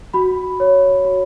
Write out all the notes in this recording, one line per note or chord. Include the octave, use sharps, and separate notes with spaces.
F#4 B5
C#5
F#4